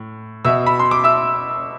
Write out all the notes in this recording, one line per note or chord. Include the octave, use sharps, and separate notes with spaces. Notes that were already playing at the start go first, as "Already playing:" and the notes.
Already playing: A2
B2 E5 E6
B5
C6
D6
E5 E6